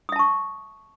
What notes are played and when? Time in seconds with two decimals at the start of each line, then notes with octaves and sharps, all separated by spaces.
0.09 D#6
0.12 E5
0.16 A5
0.19 C#6